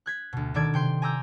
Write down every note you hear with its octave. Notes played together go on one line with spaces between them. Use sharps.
F#6 G#6 B6
D2 B2
B2 D#3 A4 D5 D6 G#6
C3 G5 C6
G#5 A#5 D6 E6 G6